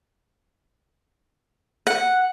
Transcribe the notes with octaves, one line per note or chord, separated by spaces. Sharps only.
F#5